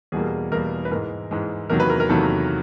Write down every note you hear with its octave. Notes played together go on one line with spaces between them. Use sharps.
E2 B2 G3 A#3 G#4
E2 B2 G3 A#3 A#4
B4
G#2 E3 G#3 A#4
G#2 E3 G#3
E2 C3 D#3 F#3 A#3 A#4
B4
A#4
A#4
E2 C3 D#3 F#3 A#3 A4